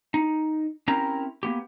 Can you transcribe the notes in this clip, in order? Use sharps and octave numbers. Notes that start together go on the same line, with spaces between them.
D#4
C4 C#4 E4 G4 A#4 A#5
A#3 B3 G4